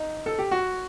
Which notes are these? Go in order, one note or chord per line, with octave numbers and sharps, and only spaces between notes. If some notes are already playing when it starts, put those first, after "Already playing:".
Already playing: D#4
A4
G4
F#4